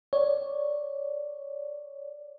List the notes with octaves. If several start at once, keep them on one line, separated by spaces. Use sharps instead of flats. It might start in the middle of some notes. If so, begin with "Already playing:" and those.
C#5 D5